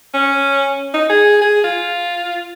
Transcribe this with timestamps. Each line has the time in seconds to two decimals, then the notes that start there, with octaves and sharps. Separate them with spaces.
0.14 C#4
0.94 D#4
1.10 G#4
1.42 G#4
1.64 F4